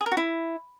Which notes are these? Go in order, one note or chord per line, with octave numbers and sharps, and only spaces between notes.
G#4
A#4
F#4
E4